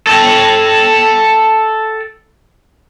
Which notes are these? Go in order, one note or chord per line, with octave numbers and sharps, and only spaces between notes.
A4 G5